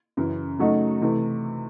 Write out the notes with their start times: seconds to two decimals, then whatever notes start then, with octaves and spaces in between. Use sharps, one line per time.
0.17 F#2 C#3 E3
0.59 C#3 F#3 A3 D#4 F#4
1.02 C3 E3 A3